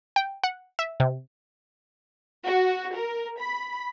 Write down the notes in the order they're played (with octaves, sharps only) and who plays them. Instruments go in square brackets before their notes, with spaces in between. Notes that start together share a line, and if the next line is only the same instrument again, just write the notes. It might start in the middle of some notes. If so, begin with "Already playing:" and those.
[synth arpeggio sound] G5
F#5
E5
C3
[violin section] F#4
A#4
B5